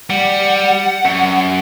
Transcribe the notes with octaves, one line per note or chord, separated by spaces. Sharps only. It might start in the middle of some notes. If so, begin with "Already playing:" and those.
G3 F#5
F#2